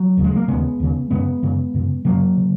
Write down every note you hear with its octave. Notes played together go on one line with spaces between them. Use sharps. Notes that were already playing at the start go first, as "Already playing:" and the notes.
Already playing: F#3
D#2 C#3
G#3
A#3
D#2 C#3 G#3 B3
D#2 C#3
F#2 C#3 G#3 B3
F#2 C#3
F#2 C#3
F#2 C#3 F#3 A#3
C#3